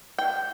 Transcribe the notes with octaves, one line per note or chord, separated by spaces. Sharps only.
G5